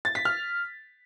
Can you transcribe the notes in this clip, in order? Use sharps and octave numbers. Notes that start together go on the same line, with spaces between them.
A6
B6
F6